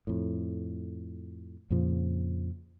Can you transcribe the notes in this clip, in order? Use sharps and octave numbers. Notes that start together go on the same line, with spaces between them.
F2 A2
F2 A#2 C#3 F3